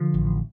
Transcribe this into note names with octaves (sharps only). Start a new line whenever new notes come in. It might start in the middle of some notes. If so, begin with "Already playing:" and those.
Already playing: D3 F3
A1